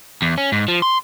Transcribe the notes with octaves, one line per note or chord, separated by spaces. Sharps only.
E2
C#4
G#2
F3
C6